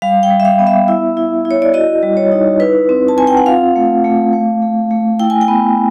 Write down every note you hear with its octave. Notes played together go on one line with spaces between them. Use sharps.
G3 F5
G5
G3
E5
F5
B3
E5
E4
E4
E4
C#5
D5
F#4 D#5
G3
C#5
D#4
E4 B4
C4
A5
C4 G#5
G5
F#5
F4 F5
A3
A3
A3
A3
A3
E4 G5
G#5
G5
B3